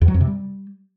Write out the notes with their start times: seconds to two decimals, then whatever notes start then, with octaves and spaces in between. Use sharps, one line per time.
0.01 E2
0.08 F#3
0.14 F2
0.21 C3
0.27 G3